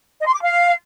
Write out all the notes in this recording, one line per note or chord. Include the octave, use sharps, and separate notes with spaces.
D#5
C6
D6
F5